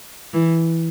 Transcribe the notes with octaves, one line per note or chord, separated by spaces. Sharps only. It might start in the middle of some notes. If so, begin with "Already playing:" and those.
E3